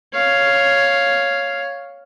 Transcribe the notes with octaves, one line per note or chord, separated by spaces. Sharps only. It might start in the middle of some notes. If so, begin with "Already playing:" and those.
C#5 F5